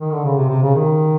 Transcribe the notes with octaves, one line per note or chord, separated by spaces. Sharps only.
D#3
D3
C#3
C3
C3
C#3
D#3